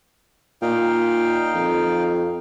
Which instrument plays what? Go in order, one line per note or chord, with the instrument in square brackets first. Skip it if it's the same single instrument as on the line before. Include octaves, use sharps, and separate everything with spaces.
[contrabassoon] A#2 [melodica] D#4 F5 G5
[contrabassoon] F2